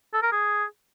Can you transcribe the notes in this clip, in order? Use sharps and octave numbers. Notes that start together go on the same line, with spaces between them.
A4
A#4
G#4